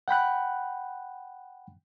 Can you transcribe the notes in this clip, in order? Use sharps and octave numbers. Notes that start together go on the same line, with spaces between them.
F#5 G5 B5 F#6